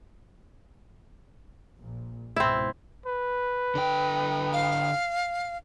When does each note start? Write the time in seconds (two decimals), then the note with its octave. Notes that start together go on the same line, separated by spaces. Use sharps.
1.79 A#1 A#2
2.36 C#2 G#2 B2 C4 E4
3.06 B4
3.75 D3 G5
4.53 F5